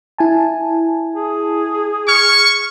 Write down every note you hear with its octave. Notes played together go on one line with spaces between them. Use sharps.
E4 G#5 A5
G#4
C#6 F6 G#6